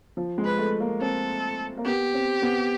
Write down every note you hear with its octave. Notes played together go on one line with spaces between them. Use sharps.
F3
G#3
B4
A3
A#3
C4 A4
A#3
B3 G4
C4
B3